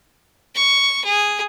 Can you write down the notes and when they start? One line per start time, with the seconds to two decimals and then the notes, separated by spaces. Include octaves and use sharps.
0.55 C#6
1.05 G#4